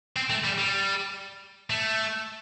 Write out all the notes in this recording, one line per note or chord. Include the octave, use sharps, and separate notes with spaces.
C4
A3
G3
G3
A3